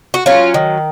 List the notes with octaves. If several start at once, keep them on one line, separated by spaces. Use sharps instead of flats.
F#4
F#3 C#4 F4
D#3